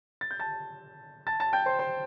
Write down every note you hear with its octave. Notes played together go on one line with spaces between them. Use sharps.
A6
G6
A5 A6
A5 A6
A5 A6
G5 G6
C5 C6
C5 C6